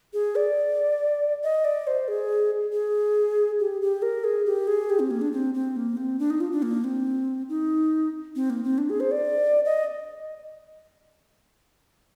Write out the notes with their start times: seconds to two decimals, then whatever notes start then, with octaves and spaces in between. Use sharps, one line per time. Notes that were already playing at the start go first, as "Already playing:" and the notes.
0.14 G#4
0.36 D5
1.44 D#5
1.65 D5
1.87 C5
2.08 G#4
2.73 G#4
3.60 G4
3.82 G4
4.02 A#4
4.24 G#4
4.46 G4
4.68 G#4
4.90 G4
5.00 C4
5.11 A#3
5.21 D4
5.33 C4
5.54 C4
5.76 A#3
5.97 C4
6.19 D4
6.30 D#4
6.41 F4
6.52 D4
6.63 A#3
6.84 C4
7.49 D#4
8.36 C4
8.50 A#3
8.64 C4
8.78 D4
8.90 G#4
9.00 C5
9.11 D5
9.65 D#5